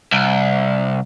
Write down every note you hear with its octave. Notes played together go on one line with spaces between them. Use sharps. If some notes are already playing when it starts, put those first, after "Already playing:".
C2